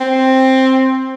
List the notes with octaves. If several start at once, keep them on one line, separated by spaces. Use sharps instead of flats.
C4